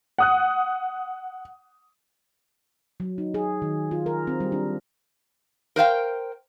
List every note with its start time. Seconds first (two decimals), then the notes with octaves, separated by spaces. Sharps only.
0.18 F#5 D#6 F#6
3.00 F#3
3.18 D#4
3.34 G#4
3.62 D#3
3.91 F4
4.06 A#4
4.27 C4
4.40 G3
4.52 D4
5.76 A#4 C5 F5 G5